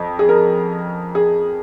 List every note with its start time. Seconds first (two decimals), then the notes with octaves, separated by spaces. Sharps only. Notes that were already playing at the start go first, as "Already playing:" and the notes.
Already playing: F2
0.19 G#4
0.29 A#4
1.15 G#4